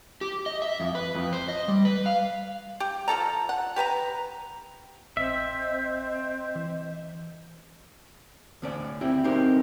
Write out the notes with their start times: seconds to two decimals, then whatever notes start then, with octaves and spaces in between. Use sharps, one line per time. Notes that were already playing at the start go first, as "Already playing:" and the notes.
0.21 G4
0.46 D#5
0.62 E5
0.80 F2
0.95 B4
1.15 F2
1.33 C5
1.48 D#5
1.68 G3
1.85 B4
2.06 F5
2.80 G4
3.08 F3 G4 A4 A#5
3.49 F#5
3.76 G4 B4 A5 A#5
5.17 A1 C4 D#5 E5
6.56 E3
8.62 D2 C#4 D5
9.01 C4 E4 G4
9.24 B1 B2 C4 D#4 G4 A#4